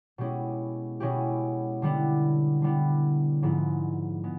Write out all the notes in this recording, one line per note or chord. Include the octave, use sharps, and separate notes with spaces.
B2 G#3 C#4 E4 G4
B2 G#3 C#4 E4 G4
D3 G3 B3 E4
D3 G3 B3 E4
G#2 F3 G#3 B3 E4
G#3 B3